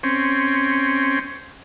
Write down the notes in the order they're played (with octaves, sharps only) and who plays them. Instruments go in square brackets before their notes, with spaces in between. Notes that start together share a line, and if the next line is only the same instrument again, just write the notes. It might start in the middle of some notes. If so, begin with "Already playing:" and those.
[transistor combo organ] C4 C#4